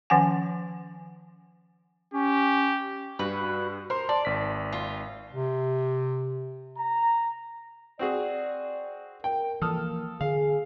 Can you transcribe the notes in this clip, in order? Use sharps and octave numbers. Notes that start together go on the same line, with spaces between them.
D#3 F3 C#4 F#5 G#5
C#4 G4
G2 F#4 B4
A#4 C5 C6
D5 A5 C6
G#1 B6
F4
C3
A#5
C4 F#4 G#4 D5
A#4 G5
E3 F3 A#3 A4 D#6 F6
D3 G#4 F5